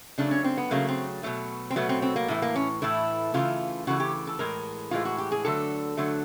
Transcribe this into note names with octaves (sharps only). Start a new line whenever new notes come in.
C#3 F#3 A3 D4
C#4
C4
B3
C#3 F#3 A3 A#3
C4
B2 F#3 A3
C4
B2 F#3 A3 B3
C4
C4
A#3
A2 E3 A3
A#3
C#4
A2 E3 A3 E4
C#3 E3 A3 F4
C#3 E3 A3 F#4
G4
A4
A2 E3 G#3 A#4
A2 E3 G#3 F4
F#4
G4
G#4
D3 F#3 A3 A4
D3 F#3 A3